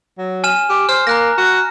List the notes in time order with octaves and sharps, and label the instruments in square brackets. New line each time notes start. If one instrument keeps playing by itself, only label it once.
[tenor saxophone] F#3
[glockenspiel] G#5 F6 E7
[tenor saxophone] G4
[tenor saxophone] C5 [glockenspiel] F6
[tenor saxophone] A#3 [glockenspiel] A#5 F#6 A#6
[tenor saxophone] F#4